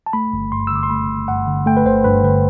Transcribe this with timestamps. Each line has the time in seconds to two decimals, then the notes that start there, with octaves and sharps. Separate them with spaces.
0.06 A5
0.13 A3 B5
0.33 G1
0.52 G2 C6
0.67 E6
0.72 D3 D6
0.83 C6
0.90 A3 B5
1.10 G1
1.28 G2 F#5
1.47 D3
1.66 A3 G5
1.77 B4
1.86 G1 C5
2.04 G2 B4
2.23 D3 B4